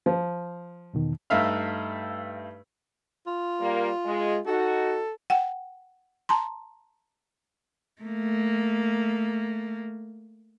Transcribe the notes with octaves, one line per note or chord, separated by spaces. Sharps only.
F3
E2 B2 D#3
G2 A3 D#4 E5 F5 F6
F4
G3 A#3
G#3
D#4 F#4 A4
F#5 G5
A5 A#5 C6
A3 A#3